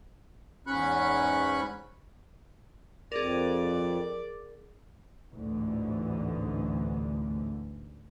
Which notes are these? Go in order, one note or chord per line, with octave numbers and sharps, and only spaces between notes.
E2 G#2 C#4 B5 C#6 F#6
F2 G#4 A#4 D5
A1 D2 G#2 D3 E3